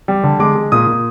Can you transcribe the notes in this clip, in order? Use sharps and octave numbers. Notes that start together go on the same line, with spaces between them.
G3
D3
G#3 D6
G#3
A#2 D#6
A#2